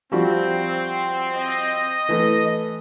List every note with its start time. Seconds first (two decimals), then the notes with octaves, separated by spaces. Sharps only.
0.12 F3 G3 C4 F#4
1.33 D#5
2.09 E3 A3